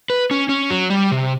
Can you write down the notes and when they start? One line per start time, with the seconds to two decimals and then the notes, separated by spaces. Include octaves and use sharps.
0.10 B4
0.31 C#4
0.49 C#4
0.70 F#3
0.90 G3
1.11 C3